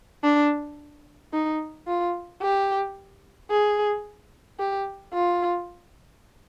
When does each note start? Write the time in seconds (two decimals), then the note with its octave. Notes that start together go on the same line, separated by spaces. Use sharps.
0.24 D4
1.33 D#4
1.87 F4
2.42 G4
3.50 G#4
4.59 G4
5.13 F4